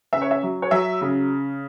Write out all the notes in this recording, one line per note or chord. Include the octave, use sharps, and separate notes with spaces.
C#3 E5
C#5
E5
F#3
C#5
F#3 E5
C#3